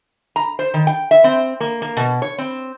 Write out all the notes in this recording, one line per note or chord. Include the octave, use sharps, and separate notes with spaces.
A#5
C5
D#3
G5
E5
C4
A#3
A#3
B2
C#5
C4